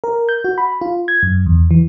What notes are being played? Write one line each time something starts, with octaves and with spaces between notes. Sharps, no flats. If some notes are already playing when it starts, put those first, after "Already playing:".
A#4
G6
F#4
B5
F4
G#6
F#2
E2
E3